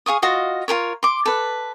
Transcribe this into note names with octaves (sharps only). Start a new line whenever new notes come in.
G#4 F5 C#6 D#6
F4 F#4 D#5 F5
F4 A4 A#4 C#5
C6 D6
A4 B4